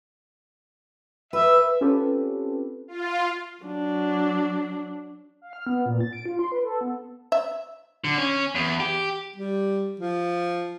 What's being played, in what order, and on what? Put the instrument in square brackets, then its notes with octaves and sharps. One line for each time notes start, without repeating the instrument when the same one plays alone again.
[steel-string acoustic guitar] B4 [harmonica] E5
[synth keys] C4 C#4 F4 G4 A4 B4
[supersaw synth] F4
[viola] F#3 D4
[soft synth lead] F5
F6
B3
A#2
A6
D7
F4
C6
B4
A4
B3
[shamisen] E5
[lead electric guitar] D3
C#4
E2
G4
[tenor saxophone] G3
F3